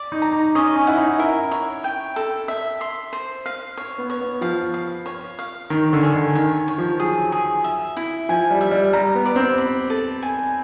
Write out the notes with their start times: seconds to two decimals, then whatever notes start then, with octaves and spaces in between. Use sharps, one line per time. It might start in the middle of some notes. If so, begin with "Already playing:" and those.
Already playing: D5
0.12 D#4
0.22 A#5
0.33 D#4
0.55 C#4 D#5
0.76 C#4
0.87 E4 F#5
0.98 D#4
1.19 E4 A#4
1.51 C#5
1.84 G5
2.16 A4
2.48 E5
2.81 C6
3.13 C5
3.46 F5
3.77 C#5
3.98 B3
4.10 C#5
4.21 B3
4.41 F3 F5
4.74 F5
5.06 C#5
5.39 F5
5.70 D#3 C#5
5.93 D3
6.03 G#5
6.14 D3
6.35 D#3 C#5
6.68 C#5
6.78 F3
7.00 F#3 G#4
7.32 G#4
7.64 E5
7.97 E4
8.29 F3 G#5
8.50 G3
8.61 E5
8.71 G3
8.93 G3 A#5
9.15 B3
9.25 D5
9.36 C4
9.58 B5
9.90 A4
10.22 G#5